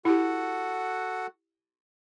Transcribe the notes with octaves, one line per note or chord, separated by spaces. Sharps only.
E4 F#4 G4 A4 F#5